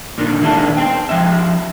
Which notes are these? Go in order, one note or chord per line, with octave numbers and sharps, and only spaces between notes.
A#2 D3 D#3
D#3 E3 G#3 A#3 D4 A4
C5 G5
F3 G#3 E5